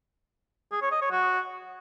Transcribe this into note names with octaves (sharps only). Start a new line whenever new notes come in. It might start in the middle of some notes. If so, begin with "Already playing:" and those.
G#4
C#5
D#5
C#5
F#4